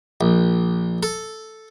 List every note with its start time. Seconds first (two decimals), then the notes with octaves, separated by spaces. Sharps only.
0.21 A#1
1.03 A4